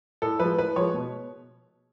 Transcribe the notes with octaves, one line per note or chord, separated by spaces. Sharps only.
A2 A4
F3 G#3 B4
A2 B4
F3 G#3 C#5
B2